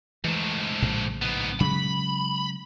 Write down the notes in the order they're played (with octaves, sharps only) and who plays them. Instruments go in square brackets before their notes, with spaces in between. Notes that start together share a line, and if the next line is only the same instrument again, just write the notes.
[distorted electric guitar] G#2 A3 [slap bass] E3
[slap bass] A#1 A2 C#3
[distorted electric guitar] G#2 B3
[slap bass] C#3 F#3 G#3 [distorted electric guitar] B5